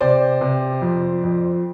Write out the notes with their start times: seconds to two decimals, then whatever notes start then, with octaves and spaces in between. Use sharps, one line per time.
0.01 C3 C5 D5
0.41 C3
0.82 F2
1.23 F2